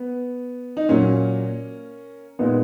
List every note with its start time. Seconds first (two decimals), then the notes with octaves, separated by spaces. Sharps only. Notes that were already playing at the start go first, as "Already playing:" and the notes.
Already playing: B3
0.77 D#4
0.89 A#2 F#3 A#3 C#4
2.39 A#2 G#3 B3 D#4